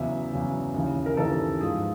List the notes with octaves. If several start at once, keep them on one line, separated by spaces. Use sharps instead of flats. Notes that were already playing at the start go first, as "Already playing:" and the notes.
Already playing: E2 C#3 F#3 E5
E2 C#3 F#3
D#2 C#3 E3
A#4
D#2 C#3 E3 A4
G#2 F3 G#4